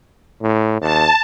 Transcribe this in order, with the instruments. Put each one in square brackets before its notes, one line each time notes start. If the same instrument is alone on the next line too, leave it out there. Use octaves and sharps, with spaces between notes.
[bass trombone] A2
[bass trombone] D#2 [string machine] A5